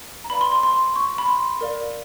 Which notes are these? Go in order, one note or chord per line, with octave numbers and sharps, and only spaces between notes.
A#5
B4 D5 F5 B5
C6
C6
C6
C#6
B5
C6
A#4 D5 F5